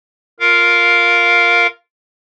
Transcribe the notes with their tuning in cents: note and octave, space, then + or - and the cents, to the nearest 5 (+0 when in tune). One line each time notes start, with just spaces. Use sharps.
F4 +0 A#4 +0 F5 +0